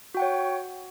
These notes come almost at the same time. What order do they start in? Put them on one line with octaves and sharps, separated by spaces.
F#4 G5 F#5 C#5